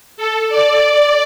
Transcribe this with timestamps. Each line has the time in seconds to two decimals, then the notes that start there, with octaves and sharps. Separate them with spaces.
0.17 A4
0.49 D5